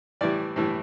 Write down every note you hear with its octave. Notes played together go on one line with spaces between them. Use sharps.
A2 E3 G3 D5
A2 E3 G3